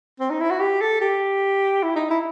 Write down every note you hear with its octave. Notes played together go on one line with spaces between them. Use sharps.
C4
D#4
E4
F#4
G4
A4
G4
E4
D#4
E4